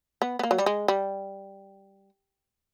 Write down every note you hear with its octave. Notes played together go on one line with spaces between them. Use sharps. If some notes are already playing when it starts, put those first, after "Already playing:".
B3
B3
A#3
F#3
G3
G#3
G3